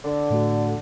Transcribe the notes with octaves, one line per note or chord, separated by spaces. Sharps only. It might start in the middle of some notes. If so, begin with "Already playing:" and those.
D3
A2 A3 F#4